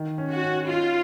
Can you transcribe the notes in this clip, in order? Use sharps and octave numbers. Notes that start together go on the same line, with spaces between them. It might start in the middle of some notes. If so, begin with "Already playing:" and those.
Already playing: D#3
C#4
F#4
C#4
D#4 F4